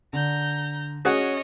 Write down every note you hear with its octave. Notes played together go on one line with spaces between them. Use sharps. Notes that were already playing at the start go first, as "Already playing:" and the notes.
D3 A#5 G6
C#4 F#4 G#4 C#5 D#5 F#5